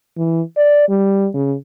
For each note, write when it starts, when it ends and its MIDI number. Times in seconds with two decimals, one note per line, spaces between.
0.18 0.41 52
0.57 0.88 74
0.89 1.29 55
1.34 1.55 49